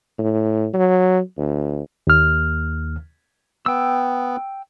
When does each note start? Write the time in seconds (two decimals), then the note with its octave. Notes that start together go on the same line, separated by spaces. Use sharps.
0.19 A2
0.74 F#3
1.38 D2
2.07 D#2 F6
3.66 B3 G5 E6